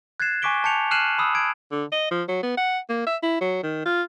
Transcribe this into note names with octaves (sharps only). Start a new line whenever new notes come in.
F#6 G#6 A6 C7 E7
G#5 C#6 D6 B6 D7 G7
A5 G6 C#7 F7
F6 F#6 C7 D#7 E7 F#7
B5 D#6 E6
G#6 D7
D3
D#5
F3
F#3
B3
F#5
A#3
E5
E4
F#3
D#3
F4